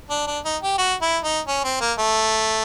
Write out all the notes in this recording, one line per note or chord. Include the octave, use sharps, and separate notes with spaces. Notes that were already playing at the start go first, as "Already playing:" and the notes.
D4
D4
D#4
G4
F#4
E4
D#4
C#4
C4
A#3
A3